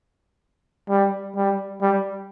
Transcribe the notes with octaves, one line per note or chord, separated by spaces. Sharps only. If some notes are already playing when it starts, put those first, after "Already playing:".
G3
G3
G3